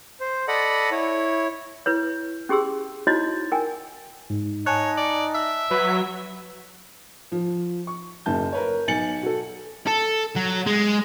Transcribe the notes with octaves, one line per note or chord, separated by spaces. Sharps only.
C5
A4 D5 D#5 F#5 B5
E4 C#5
E4 B4 C#5
C#4 G4 G#4 C6 E6
D#4 E4 F#4 C5 C#5 D#5
A#4 G5 G#5
G#2
D#4 C#5 G#5 A5 F#6
D5
E5
F#3 B4
F3
C#6
F#1 F#2 A5 G6
A#4 B4 C#5
B1 G#5 A6 C#7 F#7
F#4 A4
A4
F#3
G#3